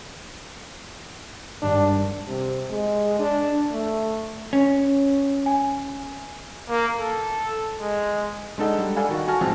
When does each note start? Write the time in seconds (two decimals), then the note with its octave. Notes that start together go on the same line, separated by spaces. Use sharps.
1.62 G#1 G2 D4
2.28 C3
2.70 G#3
3.19 D4
3.72 A3
4.53 C#4
5.46 G#5
6.69 A#3
6.99 A4
7.80 G#3
8.58 G#3 D4 D#4 A4 F#5
8.79 G3
8.96 A4 D5 F5 F#5 G#5 B5
9.09 D#3 F#4
9.28 F#4 G#5 A5 F6 A#6
9.41 A1 F3 G#3 C4 G#5 A5